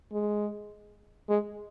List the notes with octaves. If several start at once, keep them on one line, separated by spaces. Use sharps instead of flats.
G#3
G#3